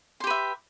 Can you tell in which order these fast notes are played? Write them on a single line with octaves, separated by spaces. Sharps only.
C6 G4 B4 E5